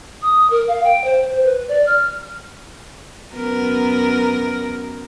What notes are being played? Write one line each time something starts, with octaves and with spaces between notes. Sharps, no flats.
D#6
A#4
F5
G5
C5
C5
B4
D5
F6
F#2 B3 A#4